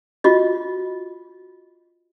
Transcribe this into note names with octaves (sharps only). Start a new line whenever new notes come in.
F4 F#4 D#5